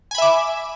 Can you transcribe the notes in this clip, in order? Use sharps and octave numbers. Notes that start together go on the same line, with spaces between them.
E5 G#5 B5 D6